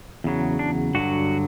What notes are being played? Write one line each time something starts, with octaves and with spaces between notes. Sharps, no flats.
E2 C#3 F#3
D4
G2 D3 F#3 F#4